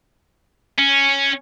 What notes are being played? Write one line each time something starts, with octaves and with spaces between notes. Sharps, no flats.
C#4